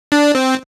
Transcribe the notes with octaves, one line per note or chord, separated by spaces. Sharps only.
D4
C4